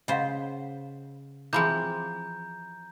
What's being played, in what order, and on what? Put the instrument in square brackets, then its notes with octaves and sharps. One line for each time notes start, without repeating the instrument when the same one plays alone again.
[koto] C#3 C5 [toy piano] D#5 F5 F#5
[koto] E3 F3 C4 [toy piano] G#4 D6 [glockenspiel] A#5 G6